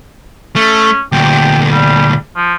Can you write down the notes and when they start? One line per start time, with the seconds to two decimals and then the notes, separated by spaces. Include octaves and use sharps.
0.56 A3 C#4
1.12 D2 A#2 G4
1.71 G3
2.36 F3